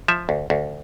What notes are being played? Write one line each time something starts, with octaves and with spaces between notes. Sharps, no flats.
F3 E5
D2
D2